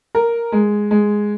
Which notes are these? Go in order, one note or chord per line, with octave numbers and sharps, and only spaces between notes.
A#4
G#3
G#3